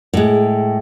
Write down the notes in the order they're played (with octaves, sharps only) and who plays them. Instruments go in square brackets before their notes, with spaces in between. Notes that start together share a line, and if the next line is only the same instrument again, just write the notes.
[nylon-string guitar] A2 G#3